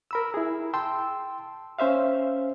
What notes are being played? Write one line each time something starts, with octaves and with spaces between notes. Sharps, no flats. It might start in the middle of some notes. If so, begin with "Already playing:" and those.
A#4 B5 E6
E4 G#4
G5 A5 C6 E6
C#4 C5 E5 F5